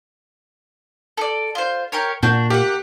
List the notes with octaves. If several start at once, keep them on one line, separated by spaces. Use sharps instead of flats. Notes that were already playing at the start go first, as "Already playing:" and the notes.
A4 D5
F4 C5
G4 A#4 C#5
A#2 D4 F#4 G6
A#3 G4 F#5